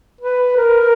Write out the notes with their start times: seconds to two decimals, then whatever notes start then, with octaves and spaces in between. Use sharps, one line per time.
0.21 B4
0.57 A#4
0.80 A#4